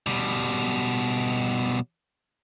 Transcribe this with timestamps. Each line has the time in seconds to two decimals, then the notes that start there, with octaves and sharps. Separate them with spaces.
0.06 B2 G3